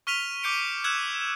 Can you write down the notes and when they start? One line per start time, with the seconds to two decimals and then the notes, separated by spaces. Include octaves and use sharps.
0.07 C#6 F6 B6 D#7 F7 G7
0.43 D6 G6 C#7 D7
0.84 E6 F#6 G#6 C#7 E7